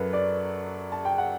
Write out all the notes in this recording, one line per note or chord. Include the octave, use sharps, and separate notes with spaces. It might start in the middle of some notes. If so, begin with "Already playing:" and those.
Already playing: F#2 F#3 A4 B4
D5
A5
G5
F#5